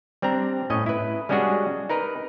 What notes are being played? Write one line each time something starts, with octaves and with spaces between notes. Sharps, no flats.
G3 C4 D4 A#5
A2 C#4 D#5
E4 B4
G3 G#3 C#4 D4 F#4 G#4
D#4 A#4 B4